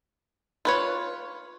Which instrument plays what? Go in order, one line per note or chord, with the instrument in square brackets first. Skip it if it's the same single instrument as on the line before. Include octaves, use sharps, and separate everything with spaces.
[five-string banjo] F4 B4 C#5